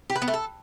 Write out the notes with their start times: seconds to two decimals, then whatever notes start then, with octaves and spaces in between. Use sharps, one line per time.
0.10 G4
0.16 B4
0.22 B3
0.28 A3
0.34 A4